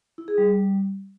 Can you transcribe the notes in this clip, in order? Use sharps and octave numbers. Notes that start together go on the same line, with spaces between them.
E4
G#4
G3